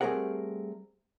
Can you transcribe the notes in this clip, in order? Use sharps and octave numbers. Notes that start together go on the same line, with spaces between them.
G3 A3 C4 G#4 A#4 F#5